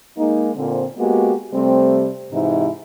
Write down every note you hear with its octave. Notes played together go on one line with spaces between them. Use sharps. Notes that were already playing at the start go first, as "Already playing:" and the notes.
G#3 A#3 D#4
A#2 D3 C4
G#3 A#3 B3 F#4 G4
C3 G3 A3 C4
G#2 C3 E3 D#4 E4